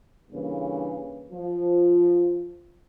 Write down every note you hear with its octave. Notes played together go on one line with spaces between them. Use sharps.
G2 C#3 E3 A#3
F3